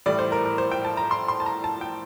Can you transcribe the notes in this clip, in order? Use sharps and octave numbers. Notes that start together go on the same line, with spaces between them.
A2 E3 G3 D5
C5
A#4
A#4
C5
G5
A5
A#5
C6
C6
A5
A#5
A5
G5